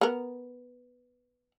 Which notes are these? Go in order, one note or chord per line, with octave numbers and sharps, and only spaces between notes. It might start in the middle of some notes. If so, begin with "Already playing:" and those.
B3 A#4